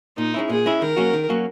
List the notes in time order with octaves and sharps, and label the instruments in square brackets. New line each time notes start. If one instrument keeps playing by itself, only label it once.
[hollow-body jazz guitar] A#2 [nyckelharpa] D#4
[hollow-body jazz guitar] G#3 C#4 E4
[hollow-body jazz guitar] A#2 [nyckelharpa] G#4
[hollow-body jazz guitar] G#3 C#4 E4
[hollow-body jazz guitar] D#3 [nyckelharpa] A#4
[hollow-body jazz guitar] F#3 A#3 C#4 F#4
D#3
F#3 A#3 C#4 F#4